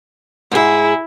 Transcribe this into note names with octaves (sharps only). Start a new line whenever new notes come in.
G#2 E4 G#4